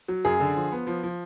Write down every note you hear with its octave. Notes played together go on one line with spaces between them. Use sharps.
F#3
F#2 G#4
D3
F3
B3
F3
F3